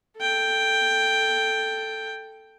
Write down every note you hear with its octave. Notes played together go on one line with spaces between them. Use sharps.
A4 G5